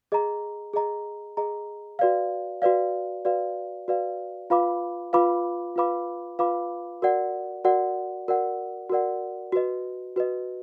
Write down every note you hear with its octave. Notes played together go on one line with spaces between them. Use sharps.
G#4 D#5 A#5
G#4 D#5 A#5
G#4 D#5 A#5
F#4 B4 D5 F5
F#4 B4 D5 F5
F#4 B4 D5 F5
F#4 B4 D5 F5
F4 B4 F5 B5 D6
F4 B4 F5 B5 D6
F4 B4 F5 B5 D6
F4 B4 F5 B5 D6
F#4 A#4 D5 F#5
F#4 A#4 D5 F#5
F#4 A#4 D5 F#5
F#4 A#4 D5 F#5
F#4 B4 D#5
F#4 B4 D#5